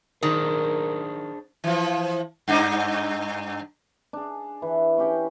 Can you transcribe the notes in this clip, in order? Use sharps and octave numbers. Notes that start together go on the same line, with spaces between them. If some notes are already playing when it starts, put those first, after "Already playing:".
D#3 D4 G#4 A#4 C5
E3 F3
G2 D4 D#4
D4 G#4
E3
C#4 G4 G5